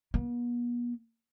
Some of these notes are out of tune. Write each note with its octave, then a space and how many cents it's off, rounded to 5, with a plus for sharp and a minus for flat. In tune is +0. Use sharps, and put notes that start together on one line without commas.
B3 -45